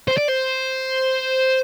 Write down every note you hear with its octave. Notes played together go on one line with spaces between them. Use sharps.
C5
D5
C5